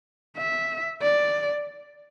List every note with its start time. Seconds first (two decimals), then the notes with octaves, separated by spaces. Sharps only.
0.37 E5
1.02 D5